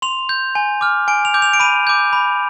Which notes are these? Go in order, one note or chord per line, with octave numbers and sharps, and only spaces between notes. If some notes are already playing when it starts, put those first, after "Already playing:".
C6 F7
G6
G#5
D6 F6
G#5 D7
F7
D6 G6
F7
D7
B5 D#7
D6 G6
B5